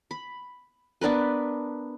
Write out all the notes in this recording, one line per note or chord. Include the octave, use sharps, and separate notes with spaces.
B5
B3 D4 A#4 B4